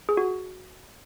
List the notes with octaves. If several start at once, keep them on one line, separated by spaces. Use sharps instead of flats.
G#4
F#4